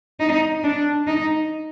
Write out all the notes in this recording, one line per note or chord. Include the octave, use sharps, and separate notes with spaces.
D#4
D4
D#4